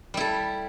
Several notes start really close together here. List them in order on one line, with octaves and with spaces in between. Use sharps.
G3 E4 A4